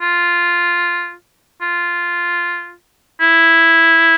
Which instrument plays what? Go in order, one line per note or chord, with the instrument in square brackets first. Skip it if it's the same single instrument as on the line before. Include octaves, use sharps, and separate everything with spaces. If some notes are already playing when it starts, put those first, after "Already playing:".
[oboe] F4
F4
E4